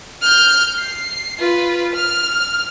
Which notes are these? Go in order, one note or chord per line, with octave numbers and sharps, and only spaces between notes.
F6 G6
C7
F4 B4
F6